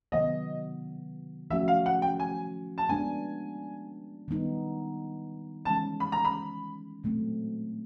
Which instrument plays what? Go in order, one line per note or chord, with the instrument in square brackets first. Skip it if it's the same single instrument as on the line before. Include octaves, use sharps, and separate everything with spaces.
[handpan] C3 D#3 F#3 B3 [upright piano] D#5
[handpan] F3 A3 C#4 F#4 [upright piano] E5
[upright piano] F5
F#5
G5
G#5
A5
[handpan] G#3 B3 D4 [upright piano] G#5
[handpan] D#3 G3 B3 D#4
[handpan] E3 G#3 C#4 [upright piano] A5
[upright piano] B5
A#5
B5
[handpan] A#2 F#3 A3 C4